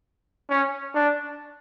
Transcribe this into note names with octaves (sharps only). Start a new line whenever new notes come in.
C#4
D4